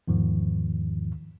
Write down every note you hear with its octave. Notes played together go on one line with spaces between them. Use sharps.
E2 G#2 D#3 F3